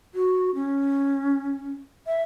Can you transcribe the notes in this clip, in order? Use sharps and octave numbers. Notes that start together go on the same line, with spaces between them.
F#4
C#4
E5